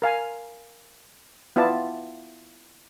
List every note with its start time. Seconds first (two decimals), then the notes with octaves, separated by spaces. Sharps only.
0.02 A#4 F5 G#5
1.56 B3 E4 F4 D5 A5